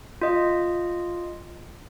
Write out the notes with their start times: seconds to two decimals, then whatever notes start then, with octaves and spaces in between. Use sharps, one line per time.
0.21 F4 D#5